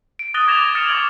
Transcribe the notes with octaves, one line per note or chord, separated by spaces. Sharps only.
D7
D#6 F#6 A6 A#6 D#7 G7
D6 G#6 A#6 E7 F7
G7
D#6 F6 A6 A#6 C#7 E7
C#6 D6 G#6 D7 F#7